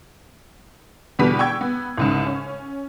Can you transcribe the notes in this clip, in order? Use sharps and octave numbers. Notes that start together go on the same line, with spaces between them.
E2 B2 D3 G3 B4 B6
G5 C#6 E6 G#6
B3
C2 G#2 C#3
C#4